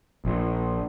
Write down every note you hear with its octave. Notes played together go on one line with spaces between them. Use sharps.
A#1